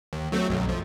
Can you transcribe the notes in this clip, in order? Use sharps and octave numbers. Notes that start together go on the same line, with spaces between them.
D#2
F#3 A3 C4
B1 F#2
F3